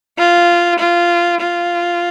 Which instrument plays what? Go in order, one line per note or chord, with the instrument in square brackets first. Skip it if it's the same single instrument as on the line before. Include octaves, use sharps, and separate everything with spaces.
[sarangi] F4
F4
F4